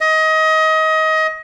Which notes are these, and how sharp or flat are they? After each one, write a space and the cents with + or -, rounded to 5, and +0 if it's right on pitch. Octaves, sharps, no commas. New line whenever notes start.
D#5 +25